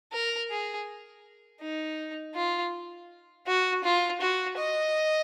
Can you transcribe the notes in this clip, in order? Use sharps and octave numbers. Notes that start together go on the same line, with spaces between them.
A#4
G#4
D#4
F4
F#4
F4
F#4
D#5